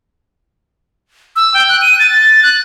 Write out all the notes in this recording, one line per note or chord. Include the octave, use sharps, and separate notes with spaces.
E6
G5
F#6
D#7
A6
F#6